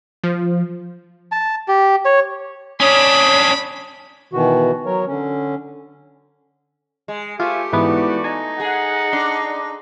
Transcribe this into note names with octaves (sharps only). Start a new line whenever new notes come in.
F3
A5
G4
C#5
C#4 D4 C#5 B5 D#6
B2 D#3 E3 F#4
F#3 A#4 C#5
D3 C#4
G#3
A3 F4 G4 C5 E5 G#5
G#2 E3 B3 F#4 B4 D5
D#4 G#5
G#4 F#5
D4 C6